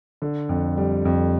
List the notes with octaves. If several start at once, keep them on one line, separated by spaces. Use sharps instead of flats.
D3
F2
G3
F2